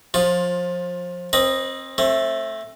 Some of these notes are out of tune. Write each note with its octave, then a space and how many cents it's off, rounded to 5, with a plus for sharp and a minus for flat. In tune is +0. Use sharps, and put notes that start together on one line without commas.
F3 +25 F4 +15
C4 +30 B4 -15 D#5 +0
A3 +0 C4 +35